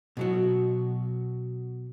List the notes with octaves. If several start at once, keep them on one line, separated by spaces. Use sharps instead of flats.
B2 F#3 F#4